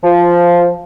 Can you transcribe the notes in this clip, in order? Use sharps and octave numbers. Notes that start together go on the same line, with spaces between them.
F3